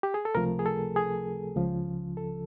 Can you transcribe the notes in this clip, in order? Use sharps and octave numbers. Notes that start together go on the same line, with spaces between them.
G4
G#4
A4
C#2 C3 F3 A3 A#4
G#4
A4
G#4
C#2 C#3 F3
A4